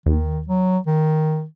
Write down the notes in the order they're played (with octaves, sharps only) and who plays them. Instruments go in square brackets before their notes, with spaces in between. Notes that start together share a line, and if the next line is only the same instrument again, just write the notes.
[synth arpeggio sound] D#2 [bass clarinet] D#3
[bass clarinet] F#3
D#3